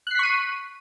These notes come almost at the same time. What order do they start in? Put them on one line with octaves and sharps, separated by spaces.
F#6 C7 B6 C#6 D#7